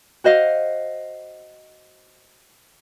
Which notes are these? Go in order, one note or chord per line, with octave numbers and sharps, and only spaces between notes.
F#4 C5 D#5 F5